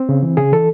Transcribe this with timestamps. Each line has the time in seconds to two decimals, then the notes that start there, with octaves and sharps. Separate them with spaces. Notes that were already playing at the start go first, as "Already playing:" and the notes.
Already playing: C4
0.09 C#3
0.23 E3
0.37 C#3 G#4
0.52 E3 A4